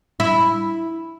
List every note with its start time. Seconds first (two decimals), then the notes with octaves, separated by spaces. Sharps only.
0.20 E4